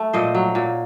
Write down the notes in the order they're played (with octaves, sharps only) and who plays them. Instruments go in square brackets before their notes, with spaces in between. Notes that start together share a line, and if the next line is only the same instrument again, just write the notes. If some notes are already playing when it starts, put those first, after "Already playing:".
Already playing: [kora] A3
A#2 C5 D#5
F#3
A#2